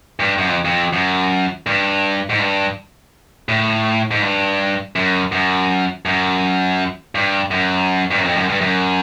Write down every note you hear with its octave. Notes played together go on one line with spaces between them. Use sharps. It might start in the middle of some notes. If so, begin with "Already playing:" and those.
G2
F#2
F2
F2
F#2
G2
G#2
G2
A2
G#2
G2
F#2
F#2
F#2
G2
F#2
G2
F#2
F2
F#2
G2
F#2